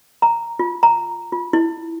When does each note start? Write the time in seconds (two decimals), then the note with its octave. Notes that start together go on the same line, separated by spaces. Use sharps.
0.22 A#5
0.59 F4
0.83 A#5
1.32 F4
1.53 E4